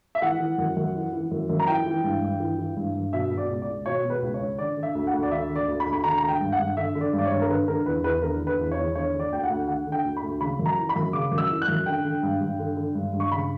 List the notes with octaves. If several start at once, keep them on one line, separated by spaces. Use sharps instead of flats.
E5
E3 F#5
E3
F#2
F#2
E3
E3
F#2
F#2
A#5
E3 G5
E3
G2
G2
E3
E3
G2
G2
B2 E5
B2
D5
C#2
D5
C#2
B2 C#5
B2
B4
C#2
C#5
C#2
D3 D5
D3
E5
D2
F#5
D2
D5
D3 E5
D3
D5
D2
B5
D2
B5
D3 A#5
D3 A#5
G5
G2
F#5
G2
D3 E5
D3
D5
G2
D5
C#5
G2
A#4
D3 B4
D3 A#4
E2 B4
E2 B4
D3 A#4
D3
B4
E2
C#5
E2
D3 C#5
D3
D5
D2 G5
F#5
D2
D3 F#5
D3
G5
D2
B5
D2
C#3 B5
F#2
A#5
E3
B5
F#2
C#3 D6
F#2
E6
E3
F#6
F#2
D3 G5
D3
G2
G2
D3
D3
G2
G2
C#6
C#3 B5